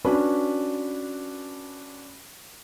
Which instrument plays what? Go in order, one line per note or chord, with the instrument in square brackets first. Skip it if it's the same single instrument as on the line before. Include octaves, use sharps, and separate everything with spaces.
[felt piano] C#4 D4 F#4 B4